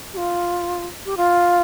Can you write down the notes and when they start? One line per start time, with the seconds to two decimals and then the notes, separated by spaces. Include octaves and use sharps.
0.14 G4
0.17 F4
1.06 G4
1.17 F4